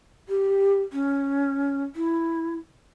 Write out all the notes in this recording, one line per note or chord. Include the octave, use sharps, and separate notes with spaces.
G4
C#4
E4